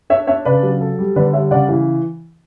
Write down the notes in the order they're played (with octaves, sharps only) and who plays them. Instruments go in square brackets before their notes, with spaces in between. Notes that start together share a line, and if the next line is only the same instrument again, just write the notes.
[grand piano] D4 [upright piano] C#5 E5
[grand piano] D4 [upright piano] C#5 E5
[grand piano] C#3 [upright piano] B4 D5
[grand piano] F#3
A4
G3
[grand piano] D3 [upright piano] B4 D5
[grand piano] G3 [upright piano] C#5 E5
[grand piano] C#3 [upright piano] D5 F#5
[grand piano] E3